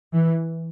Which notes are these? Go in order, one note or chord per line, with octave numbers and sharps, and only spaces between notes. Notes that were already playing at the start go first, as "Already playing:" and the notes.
E3